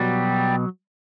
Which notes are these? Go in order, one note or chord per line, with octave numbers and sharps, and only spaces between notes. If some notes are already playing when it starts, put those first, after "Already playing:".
Already playing: B2 F#3 G3